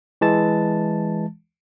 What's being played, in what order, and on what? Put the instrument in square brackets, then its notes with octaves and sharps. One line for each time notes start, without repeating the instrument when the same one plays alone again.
[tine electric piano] E3 G#3 A5 A6